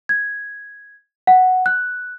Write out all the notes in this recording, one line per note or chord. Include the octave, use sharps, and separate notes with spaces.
G#6
F#5
F#6